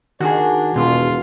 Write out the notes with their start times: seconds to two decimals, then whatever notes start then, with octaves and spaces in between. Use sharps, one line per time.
0.20 D#3 D4 F#4 G#4
0.76 E1 B2 F4